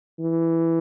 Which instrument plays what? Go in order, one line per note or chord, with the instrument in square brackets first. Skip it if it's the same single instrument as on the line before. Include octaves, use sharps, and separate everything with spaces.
[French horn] E3